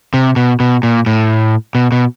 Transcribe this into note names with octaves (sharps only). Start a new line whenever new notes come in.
C3
B2
B2
A#2
A2
B2
B2